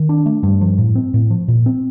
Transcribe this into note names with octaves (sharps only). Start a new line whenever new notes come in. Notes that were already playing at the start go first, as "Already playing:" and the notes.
Already playing: D#3
D4
A3
G2
F3
A2
C4
A2
F3
A#2
C4